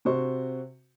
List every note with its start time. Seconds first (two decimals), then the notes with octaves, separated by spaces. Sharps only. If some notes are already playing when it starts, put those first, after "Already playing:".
0.05 C3 F#4 C5 C#6